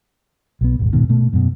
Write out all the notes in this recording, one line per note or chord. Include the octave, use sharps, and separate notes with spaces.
B1 B3
D#1 G#1
D#1 G#2 B2 D#3
B2 A3
F#2 B2